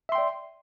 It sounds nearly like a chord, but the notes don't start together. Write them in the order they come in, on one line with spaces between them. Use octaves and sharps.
E5 C6 G5 D5